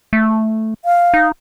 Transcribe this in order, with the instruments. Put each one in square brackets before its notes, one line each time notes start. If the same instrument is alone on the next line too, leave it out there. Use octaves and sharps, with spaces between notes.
[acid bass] A3
[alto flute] F5
[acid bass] D#4